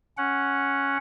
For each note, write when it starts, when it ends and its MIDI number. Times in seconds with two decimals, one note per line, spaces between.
0.18 0.98 61
0.18 0.98 78